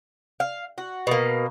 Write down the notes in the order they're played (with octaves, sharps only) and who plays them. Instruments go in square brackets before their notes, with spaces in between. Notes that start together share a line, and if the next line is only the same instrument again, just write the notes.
[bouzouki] F5
F#4
B2 A#3